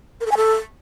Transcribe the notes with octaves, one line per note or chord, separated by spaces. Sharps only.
A#4
A4
G#5
A4